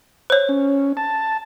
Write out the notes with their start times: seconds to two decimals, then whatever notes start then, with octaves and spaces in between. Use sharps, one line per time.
0.30 C5 C#5
0.49 C#4
0.97 A5